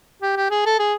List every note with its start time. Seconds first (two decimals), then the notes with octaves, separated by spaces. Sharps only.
0.22 G4
0.36 G4
0.50 G#4
0.66 A4
0.79 G#4